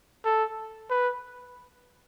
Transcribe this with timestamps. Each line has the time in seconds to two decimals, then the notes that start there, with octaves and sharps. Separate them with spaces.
0.25 A4
0.90 B4